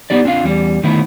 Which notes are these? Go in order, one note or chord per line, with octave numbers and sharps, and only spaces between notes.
B3 D#4 G4 D5
C4 D4 F4 F5
E2 G3
D3 D#3 A3 B3 D#4 E4